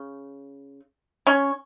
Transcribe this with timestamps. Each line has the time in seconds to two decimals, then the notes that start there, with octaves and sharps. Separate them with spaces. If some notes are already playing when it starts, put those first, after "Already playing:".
Already playing: C#3
1.27 C#4 C#5